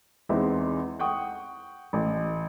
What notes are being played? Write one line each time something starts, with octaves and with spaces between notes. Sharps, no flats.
E2 E3 G#3 C4 D#4 E5
F#5 G5 C#6 D#6
A1